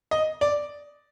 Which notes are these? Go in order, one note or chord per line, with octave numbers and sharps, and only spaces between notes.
D#5
D5